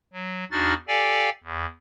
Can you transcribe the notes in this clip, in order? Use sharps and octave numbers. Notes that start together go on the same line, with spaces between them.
F#3
E2 D4 D#4 F#4 F6 A6
G4 A4 D5 F5 G5 G#5
E2